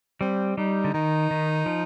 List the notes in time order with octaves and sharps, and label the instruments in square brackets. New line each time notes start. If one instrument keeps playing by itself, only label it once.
[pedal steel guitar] G3 [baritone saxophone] C4
[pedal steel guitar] G3 [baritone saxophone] D#4
[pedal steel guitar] D3
[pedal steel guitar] D#3 [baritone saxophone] D#4
[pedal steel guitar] D#3
F3